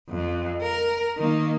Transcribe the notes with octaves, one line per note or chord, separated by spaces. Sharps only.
F2
A#4
D#3 A#3